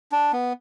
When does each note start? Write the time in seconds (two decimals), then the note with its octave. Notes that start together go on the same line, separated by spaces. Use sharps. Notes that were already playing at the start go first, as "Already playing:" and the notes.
0.12 D4
0.33 B3